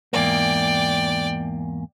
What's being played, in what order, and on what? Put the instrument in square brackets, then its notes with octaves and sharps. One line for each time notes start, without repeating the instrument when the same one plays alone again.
[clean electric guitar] E2 G#2 A#3 [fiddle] D5 G5